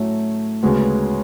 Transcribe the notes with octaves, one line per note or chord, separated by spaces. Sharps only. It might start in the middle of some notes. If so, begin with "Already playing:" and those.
Already playing: A2 F#3 A3 C#4
D2 C#3 G#3 B3 F#4